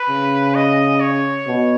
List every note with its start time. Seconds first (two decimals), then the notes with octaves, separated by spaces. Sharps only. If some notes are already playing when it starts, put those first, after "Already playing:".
Already playing: B4
0.09 C#3
0.55 D#5
1.01 C#5
1.47 B2